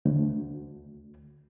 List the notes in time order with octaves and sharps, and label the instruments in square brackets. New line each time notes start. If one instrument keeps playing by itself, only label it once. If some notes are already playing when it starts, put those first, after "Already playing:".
[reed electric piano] D2